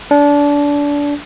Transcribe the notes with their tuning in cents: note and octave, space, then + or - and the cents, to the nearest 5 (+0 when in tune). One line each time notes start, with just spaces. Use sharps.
D4 -25